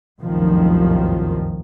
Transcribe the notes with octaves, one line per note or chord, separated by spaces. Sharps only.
F1 C2 F#2 A#2 D#3 F3